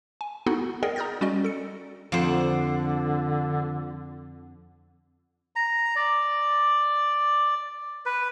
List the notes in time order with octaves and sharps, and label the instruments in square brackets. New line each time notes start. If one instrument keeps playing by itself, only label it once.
[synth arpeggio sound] G#5
B3 D#4 E4 F#4 A4 F#5
G#4 A#4 D5 D#5 F#5 G5
A#5 D#6 F6 G6 A6 A#6
G3 C#4 F#4 D5 D#5
A4 C#7
[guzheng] F2 C5 [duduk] D3 [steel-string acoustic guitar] F3 D4 F#5
[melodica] A#5
D5
B4